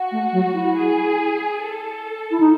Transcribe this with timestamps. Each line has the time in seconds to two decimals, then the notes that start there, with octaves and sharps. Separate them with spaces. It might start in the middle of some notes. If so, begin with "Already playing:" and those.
Already playing: F#4
0.12 A3
0.33 F#3
0.54 E4
0.76 G#4
1.63 A4
2.31 E4
2.40 D#4